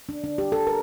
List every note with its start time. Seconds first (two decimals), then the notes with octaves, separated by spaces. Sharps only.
0.09 D4
0.24 D4
0.38 G4
0.52 A4
0.67 A#4